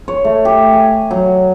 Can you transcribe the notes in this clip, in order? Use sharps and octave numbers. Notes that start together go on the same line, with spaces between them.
C#5
A3
G4
G#5
F#3